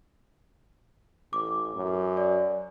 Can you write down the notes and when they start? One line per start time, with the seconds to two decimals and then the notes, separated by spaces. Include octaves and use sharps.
1.33 A1 D6
1.76 F#2
2.17 D5